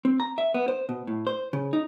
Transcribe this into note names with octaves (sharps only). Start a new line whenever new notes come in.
C4
A#5
E5
B3
C5
B2
A2
C5
C#3
D#4